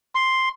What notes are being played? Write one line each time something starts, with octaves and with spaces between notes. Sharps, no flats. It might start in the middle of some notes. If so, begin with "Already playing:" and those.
C6